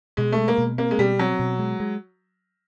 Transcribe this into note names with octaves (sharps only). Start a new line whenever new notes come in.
B2 G#3
A3
G#3
A#3
B2
A#3 C4
G#3
B2 G3
F#3 C4
B2
G#3
G#3